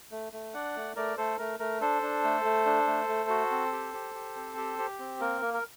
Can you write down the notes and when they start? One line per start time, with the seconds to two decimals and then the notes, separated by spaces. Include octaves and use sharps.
0.11 A3
0.32 A3
0.54 D4 D5 F#5
0.76 A3
0.96 A3 A#4 D5
1.17 A3 A4 C5
1.38 A3 A#4
1.59 A3 A#4
1.81 D4 A4 C5
2.02 D4
2.24 A3
2.45 A3
2.66 D4
2.87 A3
3.08 A3
3.29 F#4
3.51 C4
3.72 G4
3.94 G4
4.15 G4
4.36 C4
4.57 G4
4.79 G4
4.99 C4
5.20 A#3 A#4
5.42 A#3
5.54 A#4